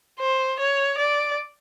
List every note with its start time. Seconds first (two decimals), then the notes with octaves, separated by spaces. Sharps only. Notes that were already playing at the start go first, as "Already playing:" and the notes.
0.20 C5
0.59 C#5
0.98 D5